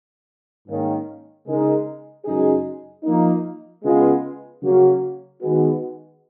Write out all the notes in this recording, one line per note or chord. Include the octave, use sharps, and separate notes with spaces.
G#2 D#3 A#3 C#4
C#3 G#3 D#4 A#4
F#2 C#3 G#3 D#4 G#4
F3 A#3 D#4
C#3 G#3 B3 F4
C#3 F#3 A#3 C#4 F#4
D#3 G#3 B3 F#4